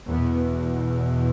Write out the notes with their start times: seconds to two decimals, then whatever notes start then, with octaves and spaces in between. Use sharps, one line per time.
0.11 E2 B2 B3